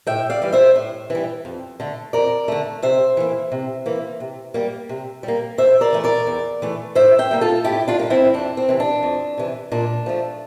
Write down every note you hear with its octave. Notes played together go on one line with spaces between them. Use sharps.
A2 E5 G5
D5 F5
E3 G3
C5 E5
A2
E3 G3
F2
D3 A3
F2 A#4 D5
D3 A3
C3 C5 E5
E3 A#3
C3
E3 A#3
C3
G3 A#3
C3
G3
A#3
E2 C5 E5
A#4 D5
E3 A3
A#4 D5
E2
E3 A3
A2 C5 E5
E5 G5
G3 A#3
F4 A4
A2 E4 G4
D4 F4
G3 A#3
C4 E4
F2 D4
C4
C3 E3
D4
F2
C3 E3
A#2 D4
F3 A3